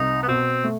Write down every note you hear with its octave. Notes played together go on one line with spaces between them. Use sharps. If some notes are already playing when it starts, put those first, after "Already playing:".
Already playing: C2 D#4
B3
B2 C4
A3